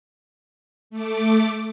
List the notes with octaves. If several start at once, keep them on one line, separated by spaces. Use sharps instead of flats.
A3 D6